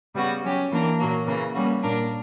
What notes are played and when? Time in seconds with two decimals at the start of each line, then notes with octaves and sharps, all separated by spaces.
0.14 C#3 G3 B3 F#4
0.42 F#3 C#4 G4
0.71 E3 A#3 D4 A#4
0.99 A#2 F#3 A#3
1.26 C#3 E3 A#3
1.54 G3 A#3 C#4 F#4
1.83 A#2 A#3 D4 A#4